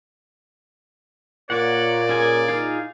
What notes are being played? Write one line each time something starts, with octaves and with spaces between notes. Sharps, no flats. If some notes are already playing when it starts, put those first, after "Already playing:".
A#2 C#5 D5 F#5
C#4 G#4 G#5
D#4 F4 G#4